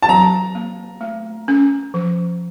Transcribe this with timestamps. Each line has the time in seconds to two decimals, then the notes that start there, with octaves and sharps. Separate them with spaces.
0.02 A5
0.08 F#3 A#5
0.55 A#3
1.01 A3
1.48 C#4
1.94 F3